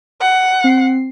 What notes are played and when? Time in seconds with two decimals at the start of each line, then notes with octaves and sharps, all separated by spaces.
0.21 F#5
0.64 C4 C7